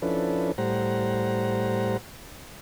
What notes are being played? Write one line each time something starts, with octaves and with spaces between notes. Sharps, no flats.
F3 C#4 D4 E4 A4 B4
A2 G3 C5 F#5 A#5